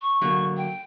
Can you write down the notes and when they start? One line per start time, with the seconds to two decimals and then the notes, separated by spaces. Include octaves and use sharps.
0.02 C#6
0.21 D3 F#3 A#3
0.57 G5